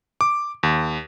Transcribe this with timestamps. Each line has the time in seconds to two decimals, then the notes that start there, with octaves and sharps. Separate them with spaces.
0.21 D6
0.63 D#2